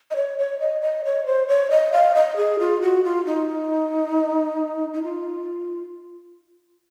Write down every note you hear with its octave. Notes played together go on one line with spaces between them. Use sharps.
D#5
C#5
C#5
D#5
D#5
C#5
C5
C#5
D#5
F5
D#5
G#4
F4
F#4
F4
D#4
D#4
F4